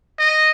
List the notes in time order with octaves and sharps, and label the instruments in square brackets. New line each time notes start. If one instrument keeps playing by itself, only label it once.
[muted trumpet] D#5